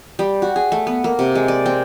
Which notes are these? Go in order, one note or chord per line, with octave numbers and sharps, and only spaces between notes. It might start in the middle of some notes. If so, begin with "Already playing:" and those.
G3
F#4
G#4
A3
B3
A#3
C3
G#3
D5
C4